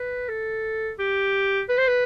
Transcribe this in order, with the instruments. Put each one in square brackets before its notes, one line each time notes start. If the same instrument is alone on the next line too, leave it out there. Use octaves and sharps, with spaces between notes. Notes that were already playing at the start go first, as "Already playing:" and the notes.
Already playing: [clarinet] B4
A4
G4
B4
C5
B4